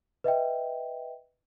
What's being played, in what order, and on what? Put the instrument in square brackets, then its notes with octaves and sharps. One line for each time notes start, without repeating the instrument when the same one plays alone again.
[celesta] B4 D#5 E5 G5